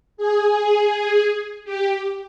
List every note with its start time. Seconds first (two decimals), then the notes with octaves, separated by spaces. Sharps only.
0.17 G#4
1.64 G4